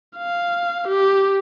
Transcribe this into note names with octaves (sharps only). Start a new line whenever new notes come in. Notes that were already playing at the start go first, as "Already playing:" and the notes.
F5
G4